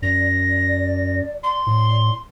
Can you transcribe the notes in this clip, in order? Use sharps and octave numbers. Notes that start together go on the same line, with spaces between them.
F#2 D5 A#6
D5 C6
A2